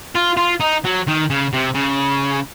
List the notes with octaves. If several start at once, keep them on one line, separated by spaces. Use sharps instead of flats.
F4
F4
D#4
F#3
D#3
C#3
C3
C#3